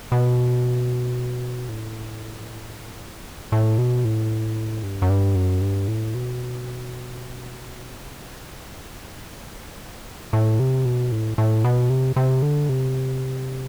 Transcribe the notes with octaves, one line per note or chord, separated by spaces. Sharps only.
B2
A2
E2
A2
B2
A2
G2
F#2
G2
F#2
G2
A2
B2
C3
B2
C3
B2
A2
C3
B2
A2
A2
B2
C3
C3
D3
C3